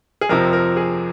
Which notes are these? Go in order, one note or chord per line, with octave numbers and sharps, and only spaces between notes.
G#4
F2 C3 F3 A#4
A#4
G#4